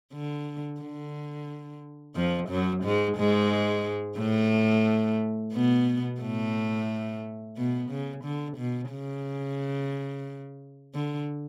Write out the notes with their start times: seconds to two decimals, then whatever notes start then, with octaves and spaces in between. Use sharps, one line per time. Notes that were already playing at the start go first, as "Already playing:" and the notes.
0.14 D3
0.81 D3
2.15 F2 F3
2.49 F#2 F#3
2.84 G#2 G#3
3.18 G#2 G#3
4.18 A2 A3
5.53 B2 B3
6.21 A2 A3
7.57 B2 B3
7.90 C#3
8.25 D3
8.58 B2
8.91 C#3
10.95 D3